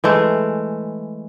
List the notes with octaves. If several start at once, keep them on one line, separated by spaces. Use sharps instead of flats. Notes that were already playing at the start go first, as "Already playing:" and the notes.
E3 G#3 A3